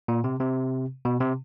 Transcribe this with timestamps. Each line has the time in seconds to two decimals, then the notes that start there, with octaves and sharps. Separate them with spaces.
0.08 A#2
0.24 C3
0.40 C3
1.05 B2
1.21 C3